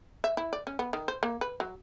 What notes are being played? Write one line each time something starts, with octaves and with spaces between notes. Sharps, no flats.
E5
E4
D5
C#4
B3
D#3
C5
A#3
B4
F#3